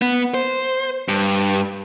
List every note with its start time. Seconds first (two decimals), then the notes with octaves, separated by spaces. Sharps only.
0.02 B3
0.34 C5
1.09 G2